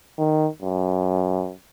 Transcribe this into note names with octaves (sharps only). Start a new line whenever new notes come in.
D#3
F#2